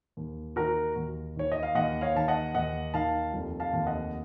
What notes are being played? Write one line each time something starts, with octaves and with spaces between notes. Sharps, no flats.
D#2
D#3 F#4 A#4
D#2
D#3 C#5
D#5
F5
D#2 D#5 F#5
C#5 F5
D#3 A5
D#5 F#5
D#2 D#5 F#5
D#3 F5 A5
F1
F5 A5
D#2
D#5 F#5